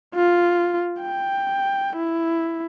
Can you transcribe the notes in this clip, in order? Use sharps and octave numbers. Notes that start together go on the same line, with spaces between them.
F4
G5
E4